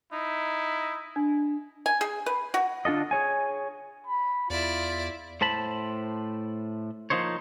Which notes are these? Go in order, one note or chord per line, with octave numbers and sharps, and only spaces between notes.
D#4 E4
D4
G#5
G#4
B4
F#4
D3 D4 F4 A4 D#5
G#4 C#5 G#5
B5
E2 E4 F4 D5
A2 C5 A5 B5
F3 A#3 D#4 C5 C#5